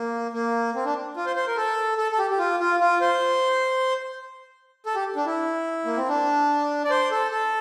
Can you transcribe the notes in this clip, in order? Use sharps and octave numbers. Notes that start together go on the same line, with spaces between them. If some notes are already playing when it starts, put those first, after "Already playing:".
Already playing: A#3
A#3
C4
D4
F4
C5
C5
A#4
A4
A4
A4
G4
G4
F4
F4
F4
C5
A4
G4
D4
E4
A#3
C4
D4
D5
C5
A4
A4